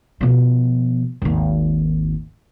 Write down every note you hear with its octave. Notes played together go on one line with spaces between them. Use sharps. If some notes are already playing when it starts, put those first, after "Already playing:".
B2 F3
G#1 D#2